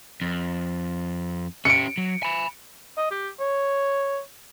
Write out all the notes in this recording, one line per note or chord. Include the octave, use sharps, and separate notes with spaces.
F2
C#4 G4 C#7 D7
F#3
G#5 B5
D#5
G4
C#5